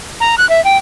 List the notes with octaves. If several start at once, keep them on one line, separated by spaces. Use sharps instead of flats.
A#5
F#6
E5
G5